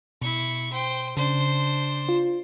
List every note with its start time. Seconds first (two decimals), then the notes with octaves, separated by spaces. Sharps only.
0.22 B2 E4 C#6
0.72 C5 G5
1.17 C#3 D4 C5
2.09 F4